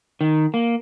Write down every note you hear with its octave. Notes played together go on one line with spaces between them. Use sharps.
D#3
A#3